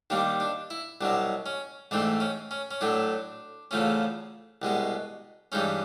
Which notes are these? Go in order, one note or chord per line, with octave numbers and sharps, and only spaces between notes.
D#2 D#3 G3 A#3 D4
D4
E4
C2 B2 F#3 D4
C#4
G#2 E3 A3 C4 D4
C#4
C#4
C#4
A2 F#3 A3 D4
E2 C#3 F3 A3 C#4
C2 B2 G#3 B3
G2 E3 G#3 C#4 D#4